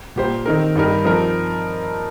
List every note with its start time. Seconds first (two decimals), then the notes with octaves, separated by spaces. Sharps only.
0.16 A#2 A#3 G4 C5
0.46 D#3 C4 D#4 A#4
0.75 G2 G3 D#4 G4 A#4
1.05 F3 C4 D#4 A#4